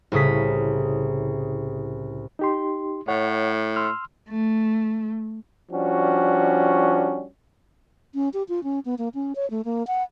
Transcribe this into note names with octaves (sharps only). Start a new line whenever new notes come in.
C2 A2 C#3 D#6 B6
D#4 G4 C6
A2 C#5 F#5
C6 E6 F6
A3
F3 G3 C#4 D4 F#4
C#4
G4
F4
C#4
B3
A#3
C#4
C#5
A3
A#3
F#5